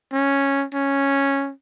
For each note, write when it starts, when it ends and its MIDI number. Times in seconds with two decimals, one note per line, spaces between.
0.12 0.66 61
0.74 1.51 61